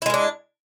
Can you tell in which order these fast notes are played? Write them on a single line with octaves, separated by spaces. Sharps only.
E4 G#3 A#4 D4